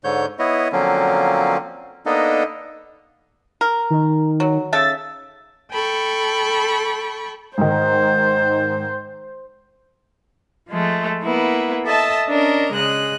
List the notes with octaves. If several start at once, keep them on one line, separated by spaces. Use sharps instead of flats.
G#2 D3 C#5 G6
B3 E4 C#5 D#5
D3 F3 F#3 A#3 C4 C#4
A#3 B3 D4 D#4 A4 D#5
A#4
D#3
F#3
C#3 A4 E5 A6
A4 G5 B5 C#6
G#2 D#3 C5
F3 G#3 A3
A#3 B3 E4
A4 D#5 E5 A5
C#4 D4 A#4 D#5
C#3 G#3 D#5 F#6